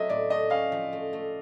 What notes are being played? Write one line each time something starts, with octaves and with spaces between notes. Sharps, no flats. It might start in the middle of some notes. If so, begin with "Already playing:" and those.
Already playing: F#3 A3 C4 D#5 E5
A2 D5
A3 D#5
C#4 F5
F3
A3
A3